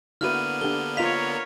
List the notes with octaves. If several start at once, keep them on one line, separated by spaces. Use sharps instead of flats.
D3 A#3 B3 E4 F#4 B4 F6 D#7
D4 G4 A4 G7
F4 A#4 C#5 D#5 F5 B6 F7